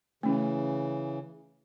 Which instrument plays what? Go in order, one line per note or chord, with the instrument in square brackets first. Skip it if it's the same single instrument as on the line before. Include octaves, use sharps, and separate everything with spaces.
[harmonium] C#3 E3 [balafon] A3 C#4